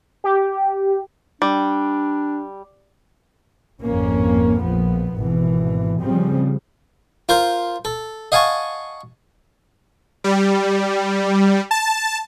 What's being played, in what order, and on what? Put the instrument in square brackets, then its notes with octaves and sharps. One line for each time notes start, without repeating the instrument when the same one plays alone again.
[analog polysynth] G4
[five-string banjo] G3 [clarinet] D4
[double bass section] G#1 F2 A#3 C#4
A#1 F3 B3
G#1 B2 E3
C#3 F3 G3 C4
[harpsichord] F4 A#4 C5
A4
D#5 F5 F#5 G#5 A5 C#6
[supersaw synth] G3
A5